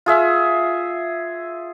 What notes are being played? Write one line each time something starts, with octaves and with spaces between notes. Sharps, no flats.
F4 G#4 E5